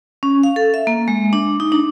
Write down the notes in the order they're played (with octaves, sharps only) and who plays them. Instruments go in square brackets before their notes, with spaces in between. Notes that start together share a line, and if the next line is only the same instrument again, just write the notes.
[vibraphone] C#4
F5
A4
E5
A#3
G#3
D4
D#4
D4